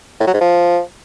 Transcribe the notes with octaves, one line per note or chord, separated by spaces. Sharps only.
A2
F#3
G#2
F3